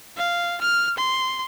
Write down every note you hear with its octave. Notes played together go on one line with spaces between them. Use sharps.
F5
F6
C6